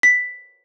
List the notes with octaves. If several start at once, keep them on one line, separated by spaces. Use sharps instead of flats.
B6